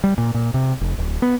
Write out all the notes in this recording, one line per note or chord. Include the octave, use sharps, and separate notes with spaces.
G3
A#2
A#2
C3
F1
D1
B3